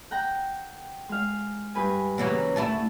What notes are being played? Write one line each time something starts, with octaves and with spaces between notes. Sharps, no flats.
F#5 G5 A#5
G#3 F5
G2 B4 G#5
C#3 E3 F#3 A#3 C#4 F#4
D2 A3 E4 A5